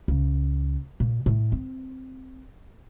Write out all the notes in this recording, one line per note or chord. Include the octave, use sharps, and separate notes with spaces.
C#2
A#2
A2
C4